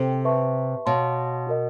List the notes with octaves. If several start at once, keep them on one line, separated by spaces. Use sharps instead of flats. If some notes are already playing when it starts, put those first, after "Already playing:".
Already playing: C3 A4 C5 G5
B4 E5 A5 C#6
B2 C#5 F5 A5 C6
F#4 A#4 D#5